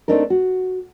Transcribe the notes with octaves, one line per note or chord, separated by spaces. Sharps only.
A3 A#3 C4 D4 D#4 A#4
F#4